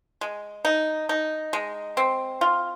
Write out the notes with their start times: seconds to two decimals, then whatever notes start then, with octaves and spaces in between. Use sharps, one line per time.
0.21 G#3
0.65 D#4
1.09 D#4
1.53 G#3
1.97 C4
2.41 F4